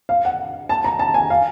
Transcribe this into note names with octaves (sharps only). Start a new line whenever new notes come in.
F5
F#5
A5
A#5
A5
G#5
F5